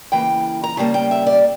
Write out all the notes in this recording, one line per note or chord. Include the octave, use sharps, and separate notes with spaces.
C#3 E3 A#3 G5
A#5
C#3 G3 A#3 A5
G5
E5
D5